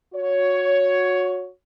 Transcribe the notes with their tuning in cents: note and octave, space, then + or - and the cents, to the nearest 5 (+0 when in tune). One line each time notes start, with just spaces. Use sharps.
F#4 -25 C#5 +10